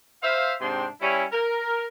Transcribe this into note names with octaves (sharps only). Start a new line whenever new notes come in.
C5 E5 F5
G#2 C3 C4 D4 G5 C6
G3 C#4 E4
A#4